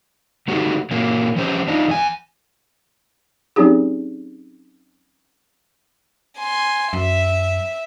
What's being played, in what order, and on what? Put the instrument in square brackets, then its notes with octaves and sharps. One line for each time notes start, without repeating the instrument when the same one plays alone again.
[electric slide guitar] D3 A3 D#4 F#4 G4 A4
A#2 E3 F#3 A#3
E3 F3 C#4 G4 C5
D4 D#4 F4
E2 D4 G#5
[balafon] F#3 C4 C#4 D#4 G4 G#4
[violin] G#5 C6
[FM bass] F#2 [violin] E5